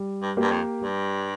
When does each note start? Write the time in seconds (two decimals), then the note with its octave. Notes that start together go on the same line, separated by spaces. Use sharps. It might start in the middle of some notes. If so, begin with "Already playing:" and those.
Already playing: G3
0.22 G2
0.37 G2 A#3 G4 A#4
0.51 F2
0.82 G2 G3